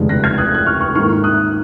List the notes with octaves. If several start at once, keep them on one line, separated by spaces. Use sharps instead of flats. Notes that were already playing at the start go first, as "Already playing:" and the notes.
Already playing: F1 D#2 C#3 G#3
F#6 A#6
F6 G#6
D#6 F#6
F#6
C#6 F6
C#6 F6
G#2 D#3 A#3 C#6 F6
D#6 F#6